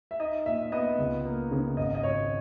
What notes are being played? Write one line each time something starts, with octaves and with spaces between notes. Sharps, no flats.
E5
D#4 D#5
A#2 E5
B3 D#5
C#2
A#3
C#3
G#1 D#5
D#5
G#1 C#5